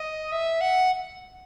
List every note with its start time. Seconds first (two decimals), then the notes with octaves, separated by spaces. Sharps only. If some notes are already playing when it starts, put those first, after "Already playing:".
Already playing: D#5
0.32 E5
0.61 F#5